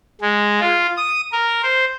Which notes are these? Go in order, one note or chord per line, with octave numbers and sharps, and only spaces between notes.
G#3
F4
D#6
A#4
C5